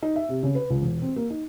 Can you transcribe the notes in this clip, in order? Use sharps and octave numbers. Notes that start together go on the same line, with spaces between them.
D#4
E5
C3
C#3
B4
C#2
E1
C4
A#3
D#4